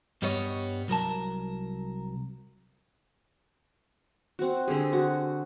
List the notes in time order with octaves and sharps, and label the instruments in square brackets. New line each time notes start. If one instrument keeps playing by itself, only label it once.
[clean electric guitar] G2 G3 B3 C#5 D#5
C2 F#3 A#4 A5
[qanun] C4 F#4
D3 C4 G4 G#4
F#4